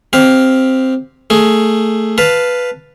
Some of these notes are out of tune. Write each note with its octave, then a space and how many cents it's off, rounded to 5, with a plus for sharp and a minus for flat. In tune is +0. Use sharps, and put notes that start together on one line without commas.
C4 +0 G4 +0 F5 +5
A3 +15 G#4 +10
B4 +0 F5 +0 A5 +0